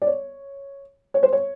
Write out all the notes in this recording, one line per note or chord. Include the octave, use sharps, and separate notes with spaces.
D5
C#5
C#5
C5
C#5